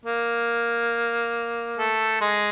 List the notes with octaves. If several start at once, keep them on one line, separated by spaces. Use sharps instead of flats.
A#3
A3
G#3